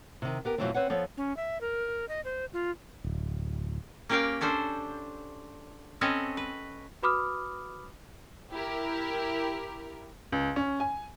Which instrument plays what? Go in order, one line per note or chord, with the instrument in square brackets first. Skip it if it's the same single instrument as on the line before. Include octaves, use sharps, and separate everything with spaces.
[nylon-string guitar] C3 D#3
B3 G4 A#4
F2 B2 E3 F#3 A3 C4
C4 B4 C#5 F#5
F3 B3 A4 C#5
[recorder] C#4
E5
A#4
D#5
C5
F4
[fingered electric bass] D1
[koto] A#3 C#4 G4 A#4 F5 G5
C#4 D4 A4 C5
C4 C#4 A4 B4 C#5 D#5
B4
[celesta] F#4 B4 B5 D6 D#6 F6
[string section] E4 G4 A#4
[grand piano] C#2
C#4
G#5